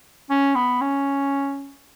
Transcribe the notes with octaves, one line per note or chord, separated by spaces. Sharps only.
C#4
B3
C#4